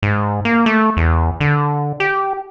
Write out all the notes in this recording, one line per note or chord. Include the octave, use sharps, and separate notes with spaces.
G#2
A#3
A3
E2
D3
G4